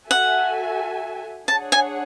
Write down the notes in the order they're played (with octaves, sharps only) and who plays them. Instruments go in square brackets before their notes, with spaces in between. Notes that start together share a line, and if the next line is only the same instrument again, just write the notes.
[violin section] F#4 A4 E5 G#5 [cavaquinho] F#5
[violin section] D4 G#4 C#5 F#5 [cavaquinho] A5
[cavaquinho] G#5